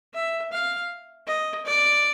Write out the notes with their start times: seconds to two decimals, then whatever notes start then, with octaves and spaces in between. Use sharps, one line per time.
0.14 E5
0.52 F5
1.27 D#5
1.65 D5